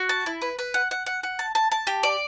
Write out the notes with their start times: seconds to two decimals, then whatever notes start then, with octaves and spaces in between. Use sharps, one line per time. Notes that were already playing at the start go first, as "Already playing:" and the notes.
Already playing: F#4
0.09 A5
0.26 E4
0.42 B4
0.59 B4
0.74 F#5
0.91 F#5
1.06 F#5
1.23 F#5
1.39 A5
1.55 A5
1.72 A5
1.87 G4
2.03 D5